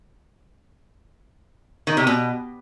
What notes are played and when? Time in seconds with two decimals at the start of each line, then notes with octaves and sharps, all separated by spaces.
1.87 D#3
1.97 C3
2.07 B2